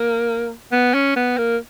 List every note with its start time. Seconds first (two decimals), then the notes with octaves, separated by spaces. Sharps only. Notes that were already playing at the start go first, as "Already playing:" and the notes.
Already playing: A#3
0.72 B3
0.94 C#4
1.16 B3
1.38 A#3